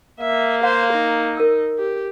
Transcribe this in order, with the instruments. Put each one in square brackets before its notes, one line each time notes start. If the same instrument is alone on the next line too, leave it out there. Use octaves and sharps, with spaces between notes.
[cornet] A#3 [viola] E5
[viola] C5 [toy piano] F5
[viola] D#4
[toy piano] A#4 E6
[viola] G4